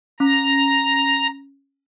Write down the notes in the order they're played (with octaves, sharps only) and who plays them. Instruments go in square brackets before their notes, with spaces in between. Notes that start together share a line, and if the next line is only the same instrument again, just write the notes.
[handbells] C#4 [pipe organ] A#5